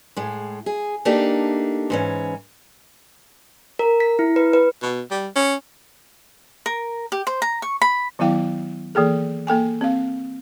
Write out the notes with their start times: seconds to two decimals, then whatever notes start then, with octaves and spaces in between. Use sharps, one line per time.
0.16 A2 G#3
0.66 G#4
1.05 A3 A#3 D4 D#4 G4
1.90 G#2 E3 C#4
3.79 A#4
4.00 B6
4.19 E4
4.36 B4
4.53 B4
4.82 B2
5.11 G3
5.36 C#4
6.66 A#4
7.12 G4
7.27 C5
7.42 A#5
7.62 C#6
7.82 B5
8.19 D#3 F#3 B3 E4 F5 G5
8.95 E3 A#3 G#4 A4
9.47 A#3 A4 G5 G#5
9.81 C4 F5